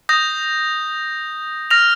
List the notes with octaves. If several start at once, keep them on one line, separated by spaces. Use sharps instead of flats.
D#6 G6 A#6
F6 A#6 F7